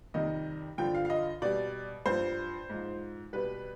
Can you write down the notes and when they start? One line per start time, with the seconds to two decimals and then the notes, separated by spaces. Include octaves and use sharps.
0.14 F2 C3 D#3 G3 D#5
0.78 G2 D3 F3 G5
0.95 F5
1.05 F5
1.10 D#5
1.42 B2 G3 D5
2.06 G2 F3 C5
2.70 G#2 F3
3.33 B2 G3 B4